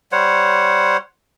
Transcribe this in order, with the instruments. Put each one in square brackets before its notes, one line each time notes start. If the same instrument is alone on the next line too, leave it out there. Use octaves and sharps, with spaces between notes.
[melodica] G3 C5 C#5 F#5